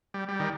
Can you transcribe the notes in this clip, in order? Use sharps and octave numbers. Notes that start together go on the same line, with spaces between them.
G3
G3
D#3